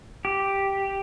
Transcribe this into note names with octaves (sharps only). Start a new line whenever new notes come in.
G4